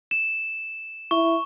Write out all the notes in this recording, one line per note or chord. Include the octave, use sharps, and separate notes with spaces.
E7
E4 C#6